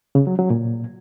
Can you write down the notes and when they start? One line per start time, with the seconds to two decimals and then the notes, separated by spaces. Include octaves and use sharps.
0.15 C#3
0.27 F#3
0.39 F#3
0.50 A#2